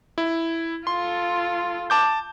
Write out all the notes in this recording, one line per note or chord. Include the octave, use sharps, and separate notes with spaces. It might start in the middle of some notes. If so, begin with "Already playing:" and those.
E4
F4 A4 C6
A5 D6 G6